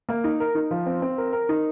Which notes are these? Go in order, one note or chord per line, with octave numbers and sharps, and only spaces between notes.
A#3
D#4
A#4
D#4
F3
C4
C4
A#4
A#4
D#4